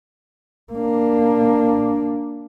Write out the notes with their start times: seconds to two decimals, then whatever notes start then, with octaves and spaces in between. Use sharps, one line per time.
0.73 A#3 D4